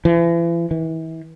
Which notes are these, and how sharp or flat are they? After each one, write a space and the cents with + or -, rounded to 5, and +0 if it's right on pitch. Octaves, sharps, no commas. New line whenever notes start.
E3 +40
E3 -35